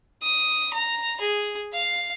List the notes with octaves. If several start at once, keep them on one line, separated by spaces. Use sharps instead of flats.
D#6
A#5
G#4
F5